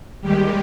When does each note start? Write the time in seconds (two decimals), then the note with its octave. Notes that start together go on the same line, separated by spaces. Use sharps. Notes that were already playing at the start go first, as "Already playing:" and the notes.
0.21 D#2 D#3 G3 G#3 G4